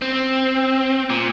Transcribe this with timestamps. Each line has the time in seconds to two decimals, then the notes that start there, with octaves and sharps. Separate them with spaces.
0.02 C4
1.10 A#2